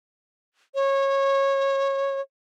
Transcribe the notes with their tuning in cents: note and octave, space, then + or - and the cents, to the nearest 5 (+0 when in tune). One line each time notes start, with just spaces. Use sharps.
C#5 -20